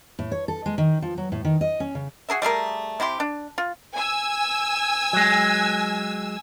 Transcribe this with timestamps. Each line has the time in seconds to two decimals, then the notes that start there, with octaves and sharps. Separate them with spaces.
0.19 A2
0.32 C#5
0.48 A4
0.66 G#3
0.78 D#3
1.02 F3
1.18 F#3
1.32 A2
1.45 D#3
1.61 D#5
1.80 C#4
1.95 C#3
2.29 F#4 G#4 A#4 E5
2.42 G3 A3 G#4 A#4
3.00 C3 E4 G4 C6
3.20 D4
3.58 F4
3.95 G#5 E6
5.13 F#3 G#3